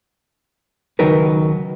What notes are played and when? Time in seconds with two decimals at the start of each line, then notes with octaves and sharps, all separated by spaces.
0.99 C#2 D#3 F#3 D#4 A#4 B4